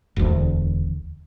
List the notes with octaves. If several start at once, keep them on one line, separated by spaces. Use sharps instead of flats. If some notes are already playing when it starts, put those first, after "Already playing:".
E1 D2